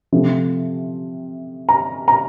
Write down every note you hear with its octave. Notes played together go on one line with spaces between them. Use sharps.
C3 F3 A3 C4
A#5
A#5